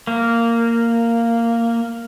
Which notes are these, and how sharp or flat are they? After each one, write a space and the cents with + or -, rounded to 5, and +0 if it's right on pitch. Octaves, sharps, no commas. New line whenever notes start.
A#3 -10